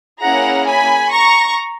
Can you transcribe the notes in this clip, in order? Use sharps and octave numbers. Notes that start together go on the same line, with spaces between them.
A#3 C#4 E4 G#4 F#5 A#5
G#5 B5
A#5 C#6